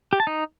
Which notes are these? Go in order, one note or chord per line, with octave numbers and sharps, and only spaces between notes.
G4
A5
D#4